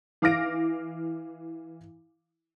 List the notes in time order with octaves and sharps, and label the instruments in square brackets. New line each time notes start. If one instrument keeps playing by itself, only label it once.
[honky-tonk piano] E3 F5 D6 F6 A#6 D7